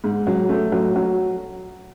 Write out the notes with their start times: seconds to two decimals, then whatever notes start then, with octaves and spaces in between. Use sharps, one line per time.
0.04 G#2
0.27 F#3
0.49 A3
0.72 F#3
0.96 F#3